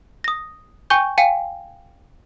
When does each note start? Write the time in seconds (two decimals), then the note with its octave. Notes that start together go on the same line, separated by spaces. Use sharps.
0.24 D#6 A#6
0.90 G5 G#5 C#6 G6
1.18 F5 G5 G#5